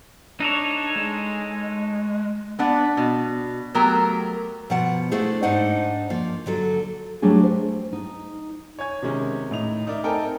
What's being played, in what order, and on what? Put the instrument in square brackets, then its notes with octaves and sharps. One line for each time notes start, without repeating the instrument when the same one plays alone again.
[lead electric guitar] D4 [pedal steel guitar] D#4 A4 C#5
[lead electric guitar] G#3
[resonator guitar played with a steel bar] B3 D4 F#5
B2
F#3 A3 B3 G4 A#4 A#5
[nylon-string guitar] B2 F3 F#5 A5
A3 D4 E4 G#4 C5
G#2 D4 D#4 C5 F#5
F3 A#3
D3 F#3 A4
F#3 G3 A3 D4 G#4
C5
D#4
[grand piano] C#5 G#5 G#6
C3 D#3 G#3 C#4
A2 D#4 F7
D#4 A#4 D5 E5
C4 D#4 A4 A#4 G5 G#5